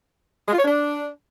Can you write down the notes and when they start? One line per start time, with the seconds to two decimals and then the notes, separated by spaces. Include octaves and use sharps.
0.47 G#3
0.53 F4
0.59 C#5
0.65 D4